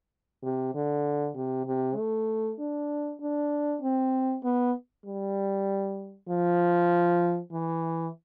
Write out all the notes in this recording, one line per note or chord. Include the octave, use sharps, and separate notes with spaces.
C3
D3
C3
C3
A3
D4
D4
C4
B3
G3
F3
E3